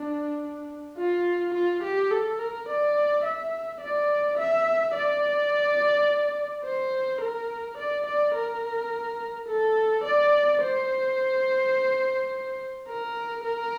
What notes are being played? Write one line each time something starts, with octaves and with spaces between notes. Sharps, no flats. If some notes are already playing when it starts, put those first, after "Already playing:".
Already playing: D4
F4
F4
G4
A4
A#4
D5
E5
D5
E5
D5
C5
A#4
D5
D5
A#4
A4
D5
C5
A#4
A#4